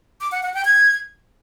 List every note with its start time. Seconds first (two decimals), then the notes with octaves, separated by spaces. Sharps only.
0.21 D6
0.32 F#5
0.43 F#5
0.54 G5
0.65 G#6